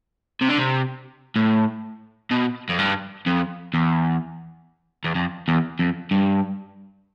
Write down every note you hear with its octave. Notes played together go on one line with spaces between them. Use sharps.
C3
D3
C3
A2
B2
F2
G2
F2
E2
E2
F2
E2
F2
G2